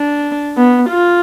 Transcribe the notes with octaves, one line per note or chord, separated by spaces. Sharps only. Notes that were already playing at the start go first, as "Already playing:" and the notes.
Already playing: D4
B3
F4